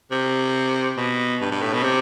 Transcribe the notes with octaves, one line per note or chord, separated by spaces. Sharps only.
C3
B2
G2
G2
A2
B2
C3